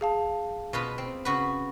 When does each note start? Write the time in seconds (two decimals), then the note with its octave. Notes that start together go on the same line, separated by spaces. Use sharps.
0.01 G#4 F5 A5
0.73 B2 F4 B4
0.98 C4
1.25 C#3 F#4 B4